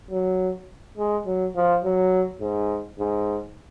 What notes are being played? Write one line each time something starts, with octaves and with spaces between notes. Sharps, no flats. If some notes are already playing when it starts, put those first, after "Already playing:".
F#3
G#3
F#3
F3
F#3
G#2
G#2